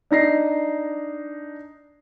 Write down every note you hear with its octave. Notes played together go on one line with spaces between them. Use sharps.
D4 D#4 A#6 C7